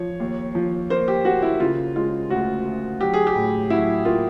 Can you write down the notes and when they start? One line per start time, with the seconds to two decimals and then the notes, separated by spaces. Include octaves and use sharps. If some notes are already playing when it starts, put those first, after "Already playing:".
Already playing: F3 C#5
0.20 D#2
0.55 F3
0.90 A#3 C5
1.08 G4
1.25 A#3 F#4
1.42 E4
1.60 C#3 F4
1.95 G#3 F4
2.30 D2 F#4
2.65 D2
3.00 F#3 G4
3.14 G#4
3.27 G4
3.35 A2
3.70 F#3 E4
4.05 A#3 F4